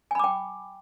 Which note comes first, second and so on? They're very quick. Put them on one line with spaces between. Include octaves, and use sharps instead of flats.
G#5 B5 D6 G5